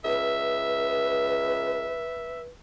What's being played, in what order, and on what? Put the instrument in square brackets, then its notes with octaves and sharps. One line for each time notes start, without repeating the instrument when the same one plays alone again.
[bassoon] C#2 [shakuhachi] B4 [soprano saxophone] E5